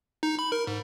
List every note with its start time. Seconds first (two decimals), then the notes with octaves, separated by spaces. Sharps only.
0.23 D#4
0.39 B5
0.52 A#4
0.67 G#2